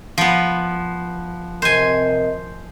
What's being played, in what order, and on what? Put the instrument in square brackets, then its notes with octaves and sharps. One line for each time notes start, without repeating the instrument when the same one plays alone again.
[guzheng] F3 B3
[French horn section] C3 A#4 D#5 [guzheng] C5 G#5